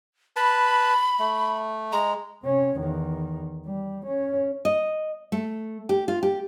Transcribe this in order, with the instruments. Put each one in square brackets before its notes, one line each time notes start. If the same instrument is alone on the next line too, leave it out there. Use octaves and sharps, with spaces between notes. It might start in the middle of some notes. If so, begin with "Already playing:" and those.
[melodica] B4 A5 [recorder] B5
[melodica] A3
[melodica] G#3 [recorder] A#5
[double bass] C3 C#4
E2 D#3
G3
C#4
[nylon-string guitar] D#5
A3
G4
F4
G4